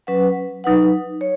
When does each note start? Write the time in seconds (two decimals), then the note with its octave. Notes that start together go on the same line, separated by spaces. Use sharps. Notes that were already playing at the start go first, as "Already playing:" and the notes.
0.07 F#3 C#4 B4 F#5
0.64 F#3 D#4 B4 F#5
1.21 C#5